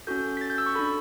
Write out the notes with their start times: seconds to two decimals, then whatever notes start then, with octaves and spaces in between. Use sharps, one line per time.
0.07 C#4 F#4 A4 G6
0.37 B6
0.41 A6
0.50 G6
0.58 E6
0.66 C#6
0.76 D4 A4 B5